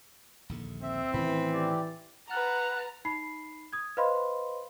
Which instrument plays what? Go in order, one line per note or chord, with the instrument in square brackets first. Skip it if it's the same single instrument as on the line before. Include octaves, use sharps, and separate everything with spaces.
[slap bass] A#1 D#2 D3
[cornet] C4 [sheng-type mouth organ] E5
[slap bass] A2 D#3 C#4 [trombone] E3 [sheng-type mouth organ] B5
[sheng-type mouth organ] G4 D5
[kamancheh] B4 F#5 [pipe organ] A5 F6 F#6 [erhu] A#5
[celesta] D#4 B5 C7
D#6 G#6
B4 C5 D#5 F5 B5 C6